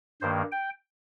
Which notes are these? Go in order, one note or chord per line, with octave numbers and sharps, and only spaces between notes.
G2 D#3 A#3 C5
G5